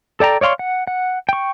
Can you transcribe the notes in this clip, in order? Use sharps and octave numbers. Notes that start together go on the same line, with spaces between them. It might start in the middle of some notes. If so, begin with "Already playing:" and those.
A4 D5 G5 A#5
C#5 D5 F5 C6 C#6
F#5
F#5
G5 C#6